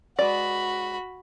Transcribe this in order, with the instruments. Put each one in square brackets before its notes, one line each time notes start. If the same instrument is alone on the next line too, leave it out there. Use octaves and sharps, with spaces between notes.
[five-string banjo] G#3 B4 D5 [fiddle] F#4 B5